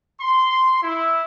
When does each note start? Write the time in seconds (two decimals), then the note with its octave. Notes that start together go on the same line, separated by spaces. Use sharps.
0.21 C6
0.82 E4